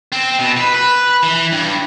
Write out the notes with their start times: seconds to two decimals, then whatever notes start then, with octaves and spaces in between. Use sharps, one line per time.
0.12 C4
0.39 B2
0.57 B4
0.74 B4
1.23 E3
1.52 G2